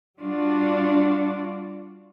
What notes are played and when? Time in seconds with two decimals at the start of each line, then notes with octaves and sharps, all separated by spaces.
0.22 G3 D4 F4 F#4